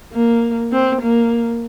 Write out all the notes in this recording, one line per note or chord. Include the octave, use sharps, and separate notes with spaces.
A#3
C4
A#3